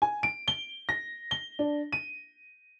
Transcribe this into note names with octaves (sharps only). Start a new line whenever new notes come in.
G#5
D7
G7
A#6
G7
D4
D#7